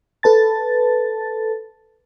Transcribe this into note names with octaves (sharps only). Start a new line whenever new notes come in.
A4 B4 A5 A6